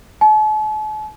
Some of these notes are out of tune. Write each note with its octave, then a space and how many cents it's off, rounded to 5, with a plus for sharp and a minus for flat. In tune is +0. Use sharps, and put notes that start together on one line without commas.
A5 -45